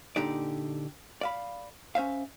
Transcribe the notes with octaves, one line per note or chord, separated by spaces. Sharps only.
A#2 D3 D#4 G4 D5
D5 F5 B5
C#4 C5 E5 F5